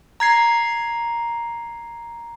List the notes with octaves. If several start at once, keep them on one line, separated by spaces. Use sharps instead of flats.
A#5 G#6 C7